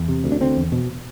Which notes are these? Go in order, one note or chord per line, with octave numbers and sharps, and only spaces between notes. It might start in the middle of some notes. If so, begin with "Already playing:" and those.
Already playing: E2
C3
D2
D4
D3 C4
E2
B2